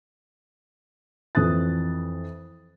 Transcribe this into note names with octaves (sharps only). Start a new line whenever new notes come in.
F2 E3 D#6 F#6 A6